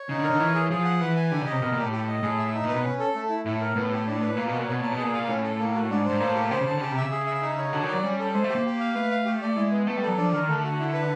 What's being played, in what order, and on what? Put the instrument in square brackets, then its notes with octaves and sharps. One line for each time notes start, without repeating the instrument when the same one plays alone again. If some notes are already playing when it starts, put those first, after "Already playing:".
Already playing: [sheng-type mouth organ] C#5
[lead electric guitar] C#3 [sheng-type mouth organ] D#4
[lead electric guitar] D3
[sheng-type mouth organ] A#4
[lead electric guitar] D3
[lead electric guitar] E3 [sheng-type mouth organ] C#5
[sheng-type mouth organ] G#4
[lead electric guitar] F3 [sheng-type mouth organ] G#4
[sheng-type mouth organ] F#5
[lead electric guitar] E3 [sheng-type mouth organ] B4
[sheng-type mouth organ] G#5
[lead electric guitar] D3 [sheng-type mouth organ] G4
[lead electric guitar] C#3 [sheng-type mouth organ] D#5
[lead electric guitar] C3
[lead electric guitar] B2 [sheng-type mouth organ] A#4
[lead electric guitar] A#2 [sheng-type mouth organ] G4
[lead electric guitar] A2
[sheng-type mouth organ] G4
D#5
[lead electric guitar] A2 [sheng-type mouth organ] G#4
[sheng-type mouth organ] E5
D#4
[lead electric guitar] A#2 [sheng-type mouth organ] B4
[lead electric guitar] B2
[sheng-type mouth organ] C#4
A4
A3
E4
[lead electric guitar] A2 [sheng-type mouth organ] E4
[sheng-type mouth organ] A#4
[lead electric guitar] A2 [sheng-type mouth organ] B3
[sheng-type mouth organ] G4
D4
B4
[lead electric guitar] A#2 [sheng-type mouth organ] A#3
[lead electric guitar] B2 [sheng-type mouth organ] F#4
[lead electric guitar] A#2
[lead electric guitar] B2 [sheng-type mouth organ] C#5
[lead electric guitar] A#2 [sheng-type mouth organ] A5
[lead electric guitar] B2
[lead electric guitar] A#2 [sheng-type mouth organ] G#4
[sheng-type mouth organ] F5
[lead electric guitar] A2 [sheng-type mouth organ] C#4
[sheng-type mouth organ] A4
A#3
F#4
[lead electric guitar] G#2 [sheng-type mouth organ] D4
[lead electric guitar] G#2 [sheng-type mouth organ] C5
[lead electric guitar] A2 [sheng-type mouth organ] A#3
[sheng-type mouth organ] G4
[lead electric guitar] C#3 [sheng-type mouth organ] C5
[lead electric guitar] C#3
[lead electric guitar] D3 [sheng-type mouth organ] A5
[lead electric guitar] C#3 [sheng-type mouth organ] G4
[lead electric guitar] C3
[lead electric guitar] C#3 [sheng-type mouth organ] E5
[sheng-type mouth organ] G#4
E5
D#4
C#5
[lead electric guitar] D3 [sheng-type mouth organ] F#4
[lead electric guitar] D#3 [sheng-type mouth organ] D5
[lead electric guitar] F#3
[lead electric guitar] G3 [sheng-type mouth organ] C#4
[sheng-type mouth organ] A4
[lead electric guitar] G#3 [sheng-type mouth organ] C5
[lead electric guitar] A3
[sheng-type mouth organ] G4
[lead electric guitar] A#3
[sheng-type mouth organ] G4
F5
[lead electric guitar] A3 [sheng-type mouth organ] B4
[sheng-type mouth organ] F5
G4
D5
[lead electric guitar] G#3 [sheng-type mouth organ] E4
[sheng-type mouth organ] B3
[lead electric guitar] A3 [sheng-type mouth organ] B3
[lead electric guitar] G3
[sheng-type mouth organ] A4
[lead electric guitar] F#3
[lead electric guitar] F3 [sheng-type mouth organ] D4
[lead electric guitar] D#3 [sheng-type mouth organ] A#4
[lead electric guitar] D3 [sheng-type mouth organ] A3
[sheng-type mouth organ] F#4
E4
B4